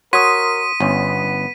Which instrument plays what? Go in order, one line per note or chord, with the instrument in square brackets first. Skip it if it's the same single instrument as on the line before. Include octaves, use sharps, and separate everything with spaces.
[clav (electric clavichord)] F#4 C#5 [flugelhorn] A#4 [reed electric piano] C6 D#6 [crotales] B6 D#7
[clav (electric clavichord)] G1 C#4 [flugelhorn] B3